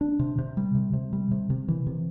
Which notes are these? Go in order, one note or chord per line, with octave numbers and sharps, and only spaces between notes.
D4
C3
C3
G3
C3
C3
G3
C3
C3
E3
C3